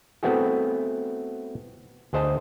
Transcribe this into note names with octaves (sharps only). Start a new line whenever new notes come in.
A3 B3 C4 E4 F#4 G#4
D2 G#4 C5 D#5 A5